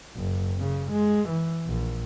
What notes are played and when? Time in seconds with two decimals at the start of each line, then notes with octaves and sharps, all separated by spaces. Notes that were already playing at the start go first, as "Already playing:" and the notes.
0.16 F#1
0.59 C#3
0.92 G#3
1.29 E3
1.66 A#1